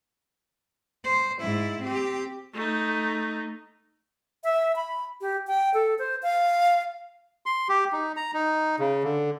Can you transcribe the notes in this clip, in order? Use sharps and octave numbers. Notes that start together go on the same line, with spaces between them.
C5
G#2 E4
C4 G4
A3 D#4
E5
B5
G4
G5
A4
C5
F5
C6
G4
D#4
A#5
D#4
C#3
D3